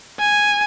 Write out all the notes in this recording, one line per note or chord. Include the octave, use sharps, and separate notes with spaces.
G#5